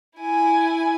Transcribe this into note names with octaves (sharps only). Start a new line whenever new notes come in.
E4 G#5